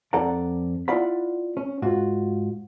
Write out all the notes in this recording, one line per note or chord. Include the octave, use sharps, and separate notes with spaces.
F2 A4 D5 F#5 A#5
B3 E4 F4 D5 F#5 B5
C#4
G#2 F4 F#4